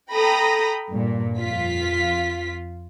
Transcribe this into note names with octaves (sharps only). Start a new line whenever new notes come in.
A4 G5 A#5 B5 D#6 A#6
G2 A#2
F2 F4 B6